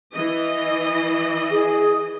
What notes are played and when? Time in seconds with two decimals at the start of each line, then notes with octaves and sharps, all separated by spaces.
0.14 E3 D#5
1.51 G#4